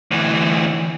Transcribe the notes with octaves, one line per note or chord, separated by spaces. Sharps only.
D2 E3